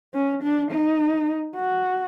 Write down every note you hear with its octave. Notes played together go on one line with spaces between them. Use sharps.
C#4
D4
D#4
F#4